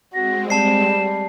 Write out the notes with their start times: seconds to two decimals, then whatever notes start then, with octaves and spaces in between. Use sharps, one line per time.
0.14 G#3 C4 F#4 A#6
0.50 G3 A5 C7 E7